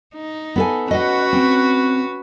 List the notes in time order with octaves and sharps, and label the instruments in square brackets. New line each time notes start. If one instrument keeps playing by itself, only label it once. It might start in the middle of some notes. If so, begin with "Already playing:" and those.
[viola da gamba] D#4
[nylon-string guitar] B3 A4 G#5
[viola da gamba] C#4 F#4 B4 [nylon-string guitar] D#5 F#5
[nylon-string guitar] C4